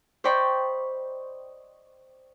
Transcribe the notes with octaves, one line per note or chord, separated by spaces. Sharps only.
C5 D5 D#5 G5 B5 C#6